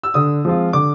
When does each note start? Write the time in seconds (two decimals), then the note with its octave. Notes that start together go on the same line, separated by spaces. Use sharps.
0.03 E6
0.14 D3 D#6
0.45 F3 G#3 C4 F4
0.73 D3 D6